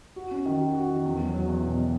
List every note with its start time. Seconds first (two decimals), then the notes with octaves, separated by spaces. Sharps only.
0.16 F#4
0.31 C#4
0.46 D#3
0.61 F#4
0.75 F#4
0.90 D#3
1.05 E2
1.20 F#3
1.33 F#3
1.48 E2
1.63 B2
1.77 F#3